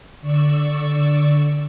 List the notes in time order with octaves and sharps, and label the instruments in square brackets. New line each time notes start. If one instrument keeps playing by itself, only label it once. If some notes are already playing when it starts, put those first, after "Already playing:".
[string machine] D3 D5 C#6 E6